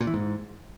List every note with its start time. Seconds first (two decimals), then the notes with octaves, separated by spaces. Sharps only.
0.01 A#2
0.07 E3
0.14 G#2